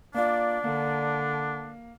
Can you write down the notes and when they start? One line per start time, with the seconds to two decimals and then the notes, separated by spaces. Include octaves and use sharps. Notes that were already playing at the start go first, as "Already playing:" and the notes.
0.14 A#3 D4 F4 D5
0.64 D3 A#3